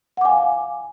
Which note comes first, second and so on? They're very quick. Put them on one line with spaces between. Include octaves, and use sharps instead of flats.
F#5 D6 G#5 F5